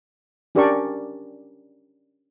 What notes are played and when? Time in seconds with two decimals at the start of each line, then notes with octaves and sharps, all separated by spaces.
0.55 C#4 D4 G4 A#4 D5 C#6